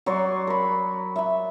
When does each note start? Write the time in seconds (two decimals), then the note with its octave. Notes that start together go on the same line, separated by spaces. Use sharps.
0.06 F#3 C#5 D5 C6
0.47 A#4 B5
1.16 E5 B5